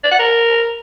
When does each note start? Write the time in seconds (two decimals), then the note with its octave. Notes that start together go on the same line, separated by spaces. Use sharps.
0.04 D5
0.11 F#5
0.19 A#4